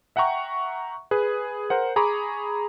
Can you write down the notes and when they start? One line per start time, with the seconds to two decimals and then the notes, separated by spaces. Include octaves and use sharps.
0.16 E5 F#5 G5 A#5 C#6
1.11 G#4 B4
1.70 A#4 C5 F#5
1.96 G#4 A#5 B5 C#6 D6